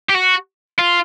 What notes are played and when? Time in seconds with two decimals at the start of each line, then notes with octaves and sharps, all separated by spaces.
0.09 G4
0.14 F#4
0.79 F4